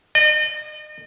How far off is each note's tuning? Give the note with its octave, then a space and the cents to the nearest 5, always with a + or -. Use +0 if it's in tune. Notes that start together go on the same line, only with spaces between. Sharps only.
D#5 -40